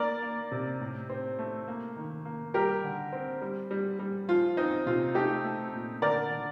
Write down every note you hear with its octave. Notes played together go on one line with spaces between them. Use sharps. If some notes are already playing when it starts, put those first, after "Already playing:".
Already playing: A#3 A#4 D5
A#3
C3
A2
C4
A3
A#3
D#3
A#3
G3 G4 A#4
D3
C4
G3
G3
G3
F3 F4
C4 D#4
C3 F4
A3 D#4 G4
A3
A#2
D3 A#4 D5
D3